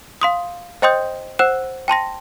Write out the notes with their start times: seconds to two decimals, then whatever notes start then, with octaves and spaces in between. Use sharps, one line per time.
0.21 F5 C6 D#6
0.82 C5 D#5 G5 C6 D#6 G6
1.39 C5 F#5 E6 F#6 E7
1.88 G5 A5 C6 A#6